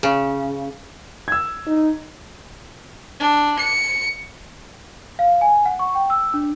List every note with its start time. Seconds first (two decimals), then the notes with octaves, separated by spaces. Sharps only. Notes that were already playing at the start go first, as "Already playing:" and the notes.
0.03 C#3
1.28 E6 G#6
1.66 D#4
3.20 D4
3.59 C#7
5.19 F5
5.41 G#5
5.66 F#5
5.79 C#6
5.95 G5
6.10 E6
6.34 D4